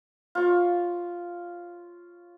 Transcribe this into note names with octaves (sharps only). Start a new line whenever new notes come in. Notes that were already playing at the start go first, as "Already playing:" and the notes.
F4 C#5